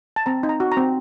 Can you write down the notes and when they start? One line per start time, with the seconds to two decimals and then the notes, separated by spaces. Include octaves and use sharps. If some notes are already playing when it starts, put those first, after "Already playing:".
0.16 A5
0.26 C4 A#5
0.43 D#4
0.49 A#5
0.60 F#4
0.72 A#5
0.77 C4